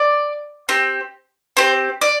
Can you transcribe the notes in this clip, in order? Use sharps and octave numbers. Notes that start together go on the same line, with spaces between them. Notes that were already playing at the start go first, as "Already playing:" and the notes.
Already playing: D5
C4 G4
C4 G4 C5
D5